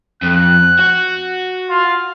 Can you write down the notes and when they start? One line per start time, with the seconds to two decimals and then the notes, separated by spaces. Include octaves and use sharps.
0.22 F2 F#6
0.79 F#4
1.69 F4